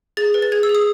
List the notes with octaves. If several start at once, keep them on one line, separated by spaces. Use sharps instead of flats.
G#4 A6
B4
A6
G#4 G#6
E6
G#4
D#6